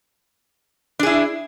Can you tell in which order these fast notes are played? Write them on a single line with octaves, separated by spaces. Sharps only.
D4 G#4 E4